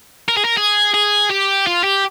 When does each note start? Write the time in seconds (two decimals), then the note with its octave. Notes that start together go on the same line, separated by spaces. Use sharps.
0.28 A#4
0.37 G#4
0.44 A#4
0.57 G#4
0.94 G#4
1.30 G4
1.67 F4
1.84 G4